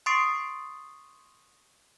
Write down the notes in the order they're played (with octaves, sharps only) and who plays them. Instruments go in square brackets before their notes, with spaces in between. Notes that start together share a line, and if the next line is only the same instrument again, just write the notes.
[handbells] C6 C#6 D#6 A6 C7 D7